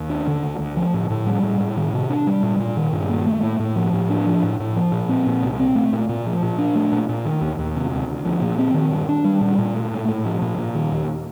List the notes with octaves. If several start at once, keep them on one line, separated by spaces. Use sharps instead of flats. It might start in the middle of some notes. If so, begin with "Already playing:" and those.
Already playing: D#2
D4
D3
D2
D2
F3
A2
A2
G3
A2
A2
D#3
C3
D4
G3
A#2
A#2
D#3
G2
A#3
A3
A2
A2
F3
A2
D4
F3
A2
A2
F3
A#2
C4
A#2
C2
C4
A3
A#2
A#2
F3
A#2
D4
A3
A#2
A#2
D#3
D#2
D#2
C3
D2
D2
F3
A#2
C4
D#3
G2
D4
G3
A#2
A#2
A3
A2
A2
F3
A#2
A#2
D#3
D#2